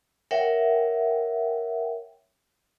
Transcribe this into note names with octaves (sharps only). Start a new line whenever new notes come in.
A#4 C#5 E5 F#5 G5